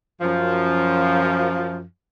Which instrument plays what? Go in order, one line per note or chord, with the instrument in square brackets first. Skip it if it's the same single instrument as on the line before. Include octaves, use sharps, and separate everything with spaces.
[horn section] F#2 F3